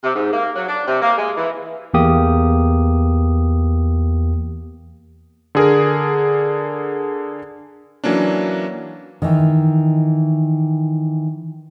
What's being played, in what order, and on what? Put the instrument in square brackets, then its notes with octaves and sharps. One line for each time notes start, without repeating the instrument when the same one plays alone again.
[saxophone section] C3
G#2
A#3
F#3
D4
C3
A#3
G#3
E3
[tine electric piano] E2 A#3 G4 D#6
[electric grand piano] D3 G#4 A#4
E3 F#3 A#3 C#4 D4
[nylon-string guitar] D#3 E3